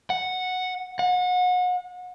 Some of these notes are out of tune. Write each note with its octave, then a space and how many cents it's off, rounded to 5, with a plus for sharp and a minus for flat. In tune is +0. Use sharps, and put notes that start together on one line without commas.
F#5 -5
F#5 -35